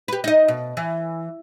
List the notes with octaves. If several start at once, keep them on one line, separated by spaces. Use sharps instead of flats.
G4 B4
D#4 D#5
B2
E3